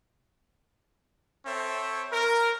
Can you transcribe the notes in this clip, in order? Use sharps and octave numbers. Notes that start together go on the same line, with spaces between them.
C4 A4 C#5 E5
A#4